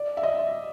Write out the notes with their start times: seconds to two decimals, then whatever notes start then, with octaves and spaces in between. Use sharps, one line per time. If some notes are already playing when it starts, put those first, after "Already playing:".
Already playing: D5
0.17 E5
0.23 D#5